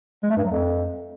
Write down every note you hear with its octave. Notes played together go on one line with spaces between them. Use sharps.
G#3
A3
G2
F#3
F2